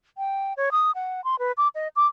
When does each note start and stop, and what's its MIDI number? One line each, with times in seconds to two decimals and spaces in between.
0.18 0.53 79
0.57 0.70 73
0.72 0.91 87
0.95 1.24 78
1.24 1.39 84
1.39 1.52 71
1.57 1.68 86
1.75 1.88 75
1.96 2.07 86